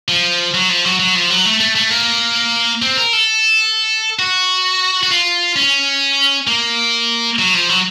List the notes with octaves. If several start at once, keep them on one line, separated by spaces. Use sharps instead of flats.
F3
F#3
F3
F#3
F#3
F3
F#3
A3
A3
A3
A#3
C4
A#4
A4
F#4
F#4
F4
C#4
A#3
F#3
F3
F#3